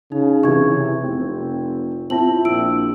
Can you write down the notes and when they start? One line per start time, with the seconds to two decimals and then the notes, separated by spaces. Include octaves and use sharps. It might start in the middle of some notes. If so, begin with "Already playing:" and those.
0.12 C#3 D#4
0.43 C3 E3 C#6 G#6
1.03 F1 C4
2.10 C4 E4 F4 A5 F#7
2.45 A#1 E6 D7